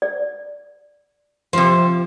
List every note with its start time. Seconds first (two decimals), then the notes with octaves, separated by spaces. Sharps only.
0.02 D5
1.53 C3 F3 G3 C5